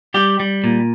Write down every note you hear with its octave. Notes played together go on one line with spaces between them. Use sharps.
G3 G4
G3
A#2